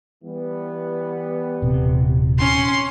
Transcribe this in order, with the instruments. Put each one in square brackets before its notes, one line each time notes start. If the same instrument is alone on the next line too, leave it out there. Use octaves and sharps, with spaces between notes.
[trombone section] E3 G3 B3
[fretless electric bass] D#1 C3
[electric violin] C#4 C6